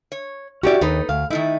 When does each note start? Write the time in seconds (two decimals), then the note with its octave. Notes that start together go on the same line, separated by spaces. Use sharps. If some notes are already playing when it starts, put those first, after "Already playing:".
0.12 C#5
0.63 C#4 E4 F#4 G4 D5
0.81 D#2 D#4 A4 B4
1.09 D2 F5
1.30 D#3 A3 D#4 E4